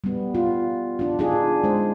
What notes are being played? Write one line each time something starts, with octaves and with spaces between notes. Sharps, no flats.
G3 B3
F4
D4 F4
D4 D#4 F4 G#4
G#3 C5